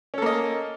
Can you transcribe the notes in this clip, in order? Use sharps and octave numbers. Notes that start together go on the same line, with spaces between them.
A#3 C#4 A4 D#5